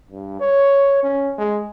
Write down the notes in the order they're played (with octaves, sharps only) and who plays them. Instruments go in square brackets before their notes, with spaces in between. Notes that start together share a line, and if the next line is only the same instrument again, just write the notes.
[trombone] G2
C#5
C#4
G#3